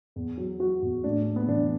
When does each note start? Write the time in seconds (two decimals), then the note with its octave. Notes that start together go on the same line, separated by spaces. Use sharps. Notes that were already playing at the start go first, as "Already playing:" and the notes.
0.16 E2
0.38 F#3
0.59 F#3 F#4
0.82 E2
1.04 A2 D4
1.26 A2
1.36 B3
1.48 E3 D4